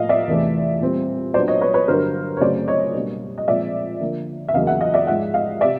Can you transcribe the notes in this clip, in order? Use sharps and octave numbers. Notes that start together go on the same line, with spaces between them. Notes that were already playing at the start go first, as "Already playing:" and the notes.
Already playing: A2 F3 A#3 D#5 F5
D5 E5
E2 C3 E3 A3
A#2 G3 C4
A#2 F#3 B3 D4 C5 D5
C#5 D#5
B4 C#5
B4 C#5
G2 D3 F#3 B3 A#4 C5
C#5
F#2 C#3 F#3 A3 C4 C5 D5
C#5 D#5
B2 G3 A#3 D4
D#5
A#2 F3 G#3 C4 D5 E5
D3 F3 A#3
E5
E2 C#3 F#3 A#3 D#5 F5
E5 F#5
D#5 F5
D5 E5
G#2 F3 G#3 E5 F#5
D#5 F5
C3 D5 E5